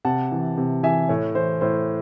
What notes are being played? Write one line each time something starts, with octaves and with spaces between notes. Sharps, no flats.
C3 F#5 A5
E3
C3
E3 E5 G#5
A2 C#5
E3 C5
A2 C5